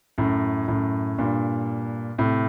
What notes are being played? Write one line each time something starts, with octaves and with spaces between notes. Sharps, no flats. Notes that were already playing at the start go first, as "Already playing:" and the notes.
F#2 A2
F#2 A2
G2 A#2
A2 C3